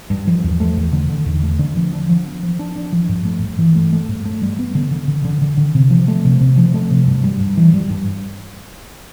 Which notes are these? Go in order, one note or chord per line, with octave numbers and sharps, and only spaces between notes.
G2
F3
E2
A3
E2
D3
D3
E2
A3
D3
F3
D4
F3
B3
F3
D4
D4
F3
G2
A3
G2
E3
A3
A3
G2
A3
G3
B3
D3
D3
D3
D3
D3
D3
C3
F3
A3
C3
C3
F3
A3
C3
G2
G3
G2
E3
G3
G2